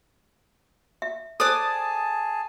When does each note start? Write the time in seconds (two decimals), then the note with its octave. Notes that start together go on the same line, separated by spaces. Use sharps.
1.02 E5
1.40 G#4 A4 C5 D5 G#5 A5 D6 D#6